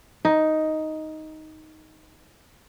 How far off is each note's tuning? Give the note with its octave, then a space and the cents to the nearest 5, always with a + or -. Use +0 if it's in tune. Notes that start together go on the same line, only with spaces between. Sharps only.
D#4 +5